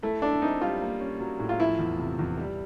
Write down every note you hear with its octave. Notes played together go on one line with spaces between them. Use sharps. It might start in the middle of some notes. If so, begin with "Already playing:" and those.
A3 E4
D4 A4
C4 D#4
G3 F4
A#3
C#4
F#3
A2
F4
F3 E4
E2
C3
E2
G3